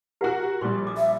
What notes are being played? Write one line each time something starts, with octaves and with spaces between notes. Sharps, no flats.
F#4 G4 A#4 F#5 G#5
A#1 G3 C6 C#6
A4 D6 D#6
E5